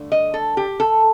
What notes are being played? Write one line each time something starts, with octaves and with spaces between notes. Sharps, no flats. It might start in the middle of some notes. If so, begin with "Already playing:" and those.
Already playing: G2 D3 A3
D#5
A4
G4
A4